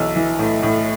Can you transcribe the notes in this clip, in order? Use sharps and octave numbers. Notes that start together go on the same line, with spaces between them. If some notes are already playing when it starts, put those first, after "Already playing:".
Already playing: B1 E3 E6
E3
A2
A2